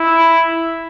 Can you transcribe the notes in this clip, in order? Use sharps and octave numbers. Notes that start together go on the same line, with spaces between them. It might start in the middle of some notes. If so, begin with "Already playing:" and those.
Already playing: E4